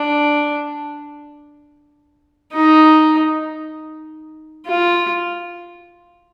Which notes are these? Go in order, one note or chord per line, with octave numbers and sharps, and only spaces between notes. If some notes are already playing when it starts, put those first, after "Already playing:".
Already playing: D4
D#4
F4